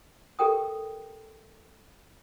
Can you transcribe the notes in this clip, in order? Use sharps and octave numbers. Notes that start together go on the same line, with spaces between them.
G4 A4 A#4 G5 D#6